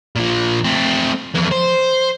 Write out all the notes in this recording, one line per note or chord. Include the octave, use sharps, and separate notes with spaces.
A#2 F3
A3 C4
F2 E3
C5